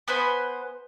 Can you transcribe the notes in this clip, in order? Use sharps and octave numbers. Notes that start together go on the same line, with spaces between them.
B3 B4 C5 G#5